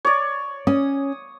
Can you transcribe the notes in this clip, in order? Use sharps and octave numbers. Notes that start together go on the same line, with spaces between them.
C#5 D5
C#4 D#6